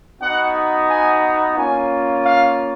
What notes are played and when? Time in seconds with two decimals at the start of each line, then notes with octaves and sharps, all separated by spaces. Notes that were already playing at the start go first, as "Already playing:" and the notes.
0.20 B3 D#4 F#4 F#5
0.88 G#5
1.55 A#3 C#4 F4 G#5
2.23 F5